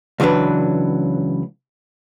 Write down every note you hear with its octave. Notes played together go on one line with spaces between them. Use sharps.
C#2 E3 F#3 D4 B4